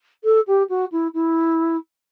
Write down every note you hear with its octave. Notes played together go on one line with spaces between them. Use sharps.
A4
G4
F#4
E4
E4